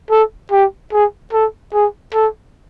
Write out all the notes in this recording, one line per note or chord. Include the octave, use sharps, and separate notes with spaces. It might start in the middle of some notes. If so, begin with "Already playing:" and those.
A4
G4
G#4
A4
G#4
A4